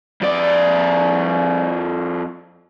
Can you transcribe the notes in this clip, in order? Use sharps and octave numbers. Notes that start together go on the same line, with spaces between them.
F2 D5